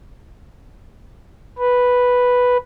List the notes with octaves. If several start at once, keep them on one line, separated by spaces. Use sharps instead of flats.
B4